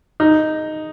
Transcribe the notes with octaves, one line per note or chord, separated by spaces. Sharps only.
D#4